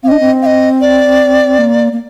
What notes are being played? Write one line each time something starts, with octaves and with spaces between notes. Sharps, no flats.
C4 F5
D4 D#5
C4
F5
D#5
D5
A#3
A#3